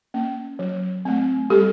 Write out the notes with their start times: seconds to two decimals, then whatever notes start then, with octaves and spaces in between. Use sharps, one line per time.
0.14 A#3 C#4
0.59 F#3
1.05 A3 C4
1.50 G3 G4 A4